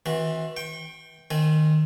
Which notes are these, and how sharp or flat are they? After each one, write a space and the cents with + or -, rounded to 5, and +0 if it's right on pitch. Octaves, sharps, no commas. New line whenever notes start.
E3 -35 C4 +25 F#4 -10
G5 +0 C#6 -40
D#3 -15 C4 +25 G#5 -25